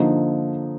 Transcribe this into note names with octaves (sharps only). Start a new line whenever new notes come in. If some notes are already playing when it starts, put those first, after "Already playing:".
Already playing: D3 F3 A#3 D#4